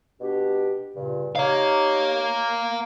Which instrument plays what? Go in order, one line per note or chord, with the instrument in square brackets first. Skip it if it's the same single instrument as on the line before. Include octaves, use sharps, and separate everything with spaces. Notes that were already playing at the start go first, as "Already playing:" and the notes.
[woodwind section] B2 D4 G4
G2 A#2 C#3
[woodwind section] D#4 G4 C#5 [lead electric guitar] F5 A#5